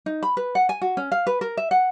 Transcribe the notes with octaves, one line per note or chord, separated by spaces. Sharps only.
D#4
B5
B4
F#5
G#5
F#4
C#4
F5
B4
A#4
E5
F#5